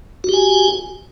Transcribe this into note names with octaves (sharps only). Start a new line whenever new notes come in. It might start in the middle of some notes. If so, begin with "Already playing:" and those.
F#4 G4 G#5